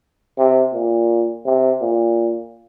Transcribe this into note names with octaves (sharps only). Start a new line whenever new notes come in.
C3
A#2
C3
A#2